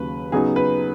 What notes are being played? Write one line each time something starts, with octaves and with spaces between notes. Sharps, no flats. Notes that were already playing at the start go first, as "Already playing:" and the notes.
Already playing: D#2 C#3 F#3 B4
C#3 F#3 B3 D#4 G#4
B4